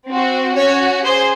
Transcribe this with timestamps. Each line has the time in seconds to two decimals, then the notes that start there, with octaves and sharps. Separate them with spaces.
0.09 C4 F#4
0.56 C#4 F#4 C#5
1.05 G#4 C5